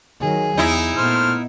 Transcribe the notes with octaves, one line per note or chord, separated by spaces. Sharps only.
D#3 F#3 G#4
E2 D#4 E4
A#2 A3 B3 C5 F6